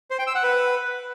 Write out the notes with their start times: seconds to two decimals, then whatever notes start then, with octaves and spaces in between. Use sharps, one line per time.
0.11 C5
0.19 G5
0.27 E6
0.35 F#5
0.43 B4